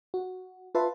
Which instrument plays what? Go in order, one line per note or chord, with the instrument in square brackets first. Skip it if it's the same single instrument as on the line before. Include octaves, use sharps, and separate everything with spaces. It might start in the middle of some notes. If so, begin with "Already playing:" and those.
[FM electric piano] F#4
F4 B4 E5 A5 C6